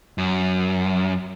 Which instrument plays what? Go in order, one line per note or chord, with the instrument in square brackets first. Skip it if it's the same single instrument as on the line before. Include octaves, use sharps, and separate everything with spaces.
[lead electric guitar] F#2